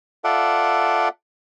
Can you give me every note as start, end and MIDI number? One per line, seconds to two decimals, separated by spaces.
0.24 1.09 65
0.24 1.09 69
0.24 1.09 74
0.24 1.09 76
0.24 1.09 78